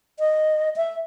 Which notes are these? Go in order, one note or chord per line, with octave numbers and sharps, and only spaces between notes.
D#5
E5